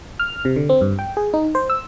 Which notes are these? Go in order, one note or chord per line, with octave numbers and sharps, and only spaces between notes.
F6
C3
D3
C4
G2
G5
G#4
D#4
C5
E6